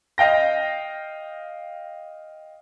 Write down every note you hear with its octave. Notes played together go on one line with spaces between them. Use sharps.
D#5 F5 G5 A#6